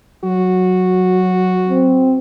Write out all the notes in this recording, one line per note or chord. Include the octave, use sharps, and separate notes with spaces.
F#3 F#4
C4